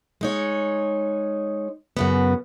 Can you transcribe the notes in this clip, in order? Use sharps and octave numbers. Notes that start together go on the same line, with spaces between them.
G#3 D#4 C#5
F#2 C#3 B3